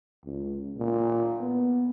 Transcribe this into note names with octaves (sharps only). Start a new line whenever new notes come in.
C#2
A#2
B3